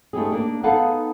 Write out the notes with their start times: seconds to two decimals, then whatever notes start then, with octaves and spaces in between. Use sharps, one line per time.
0.13 A3 B3 D#4 G4 G#4
0.32 A#3 D4
0.64 B3 D#4 G#4 A4 F5 F#5